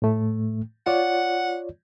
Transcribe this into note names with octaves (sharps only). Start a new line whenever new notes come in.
A2 A3
F4 C#5 D5 F#5